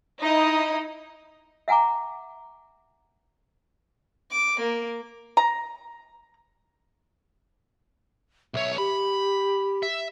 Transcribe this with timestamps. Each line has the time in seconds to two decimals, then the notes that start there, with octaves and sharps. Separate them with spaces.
0.21 D#4 E4 D#5
1.68 E5 F#5 G#5 A#5 D6
4.31 D6
4.61 A#3
5.37 A#5
8.54 B1 C#5 E5
8.78 G4 B5
9.83 E5